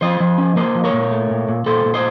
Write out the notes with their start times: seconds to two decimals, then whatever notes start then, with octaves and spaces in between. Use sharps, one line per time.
0.01 F3 C5 D#5
0.20 F3
0.38 C#4
0.56 A#3 C5 D#5
0.75 F3
0.84 A#4 C#5
0.93 A#2
1.11 A3
1.31 A#2
1.49 A#2
1.66 A#2 A4 C5
1.85 A#2
1.94 C5 D#5